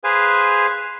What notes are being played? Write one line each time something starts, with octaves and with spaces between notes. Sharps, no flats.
G#4 B4 C5 F5 G#5